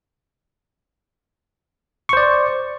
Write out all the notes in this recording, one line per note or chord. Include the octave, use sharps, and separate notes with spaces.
C5 D5 C#6